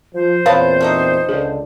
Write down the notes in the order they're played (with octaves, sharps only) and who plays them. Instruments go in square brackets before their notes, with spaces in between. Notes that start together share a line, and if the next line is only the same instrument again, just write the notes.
[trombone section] F3 [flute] C5
[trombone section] E2 A#2 C4 [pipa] B3 B4 A5 [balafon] C#5 F5
[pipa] A3 B3 D#4
[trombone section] C#2 D3 D4 [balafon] G#4